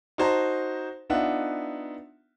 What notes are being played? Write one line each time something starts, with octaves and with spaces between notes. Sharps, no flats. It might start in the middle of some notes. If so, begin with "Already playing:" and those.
D#4 F#4 C5 A5 A#5
B3 D4 D#4 F4 E5 F#5